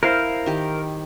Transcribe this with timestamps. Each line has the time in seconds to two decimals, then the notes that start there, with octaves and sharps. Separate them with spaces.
0.03 E4 A#4 C5 F5
0.46 D#3 G4